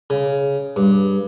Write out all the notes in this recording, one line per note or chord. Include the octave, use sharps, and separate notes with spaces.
C#3
G2